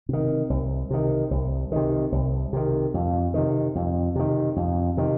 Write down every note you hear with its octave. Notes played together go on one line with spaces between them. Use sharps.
C3 D#3
C2
C3 D#3
C2
C3 D#3
C2
C3 D#3
F2
C3 D#3
F2
C3 D#3
F2
C3 D#3